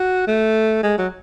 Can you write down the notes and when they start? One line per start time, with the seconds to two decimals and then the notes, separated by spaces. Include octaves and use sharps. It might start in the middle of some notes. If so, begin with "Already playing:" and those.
Already playing: F#4
0.28 A3
0.83 G#3
0.98 F#3